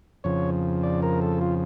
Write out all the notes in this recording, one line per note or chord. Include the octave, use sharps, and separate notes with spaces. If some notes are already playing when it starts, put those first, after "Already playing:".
F2 C#3 F3 C#5
D5
A#4
A4
F4